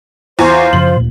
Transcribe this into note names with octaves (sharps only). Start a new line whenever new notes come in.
E2 F4 C5 G#5 C#6
F#2 C#3 F3 F#7
D2 A#2